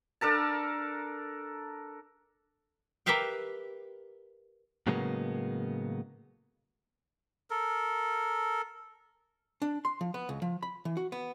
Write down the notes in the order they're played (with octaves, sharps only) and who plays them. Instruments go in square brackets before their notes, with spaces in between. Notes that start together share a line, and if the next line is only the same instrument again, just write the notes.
[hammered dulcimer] D4 A4 A#4 A5
[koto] G4 A#4 B4 E5 F5 G5
[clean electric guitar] A2 C#3 F#3 G#3 A#3 B3
[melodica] A4 A#4
[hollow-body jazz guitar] D4
C6
F3
B3
C#2
F3
B5
E3
F#4
B3